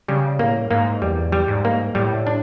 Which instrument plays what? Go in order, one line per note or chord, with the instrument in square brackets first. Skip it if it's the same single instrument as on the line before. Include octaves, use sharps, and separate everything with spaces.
[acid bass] C#3 [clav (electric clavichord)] G3
[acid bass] A2 [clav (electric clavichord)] A#3
[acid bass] G#2 [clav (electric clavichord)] A#3
[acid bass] E2 [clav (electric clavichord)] G3
[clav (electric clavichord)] G3
[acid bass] G#2
[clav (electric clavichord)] A#3
[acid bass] A2 [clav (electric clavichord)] G3
[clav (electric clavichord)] D4